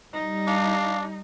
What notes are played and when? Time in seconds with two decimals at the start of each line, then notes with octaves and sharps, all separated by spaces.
0.13 G3 D#4
0.47 D4 F5